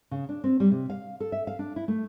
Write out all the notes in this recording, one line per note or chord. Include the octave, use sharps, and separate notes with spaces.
C#3
D4
C4
G3
C3
F5
A4
E5
F5
D4
E4
A3